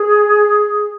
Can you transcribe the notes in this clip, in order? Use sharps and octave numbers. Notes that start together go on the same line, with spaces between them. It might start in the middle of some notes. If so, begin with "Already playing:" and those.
Already playing: G#4